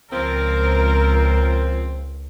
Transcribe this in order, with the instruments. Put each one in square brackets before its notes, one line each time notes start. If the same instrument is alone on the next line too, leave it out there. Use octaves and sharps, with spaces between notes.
[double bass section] C#2 [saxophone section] A#2 F3 C4 [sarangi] A#4